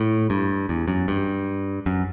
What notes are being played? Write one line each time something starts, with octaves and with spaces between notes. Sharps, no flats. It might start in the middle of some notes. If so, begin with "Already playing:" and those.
Already playing: A2
G2
E2
F#2
G2
F#2